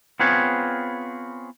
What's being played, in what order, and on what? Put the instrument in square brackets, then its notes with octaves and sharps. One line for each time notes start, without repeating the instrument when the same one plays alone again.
[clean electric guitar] B3 C4 F4 G#4 B4 C#5